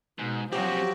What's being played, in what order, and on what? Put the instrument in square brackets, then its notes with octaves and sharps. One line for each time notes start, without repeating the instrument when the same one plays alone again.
[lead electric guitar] G#2 [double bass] B2
[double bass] F3 F#3 [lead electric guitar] C4 C#4 [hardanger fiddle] F#4 [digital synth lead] G4